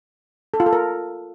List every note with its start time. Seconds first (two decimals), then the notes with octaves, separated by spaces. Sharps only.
0.54 A4
0.60 F4
0.66 A4
0.73 A#4